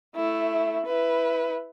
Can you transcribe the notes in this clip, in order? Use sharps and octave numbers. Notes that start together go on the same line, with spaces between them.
A3 E4
E4 B4